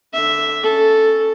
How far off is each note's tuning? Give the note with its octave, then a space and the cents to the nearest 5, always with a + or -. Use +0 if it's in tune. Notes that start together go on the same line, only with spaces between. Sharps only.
D3 +0 E5 +0
C#4 +0 A4 +0